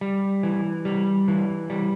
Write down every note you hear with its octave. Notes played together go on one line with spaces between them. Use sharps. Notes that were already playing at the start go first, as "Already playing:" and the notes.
G3
E3
G3
E3
G3